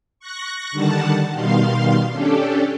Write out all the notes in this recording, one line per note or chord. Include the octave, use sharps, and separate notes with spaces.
C#6 F#6 A#6
D3 D#3 G3 F#5 A5
B2 D#3 G3 F5 C6
C#4 D4 G4 A4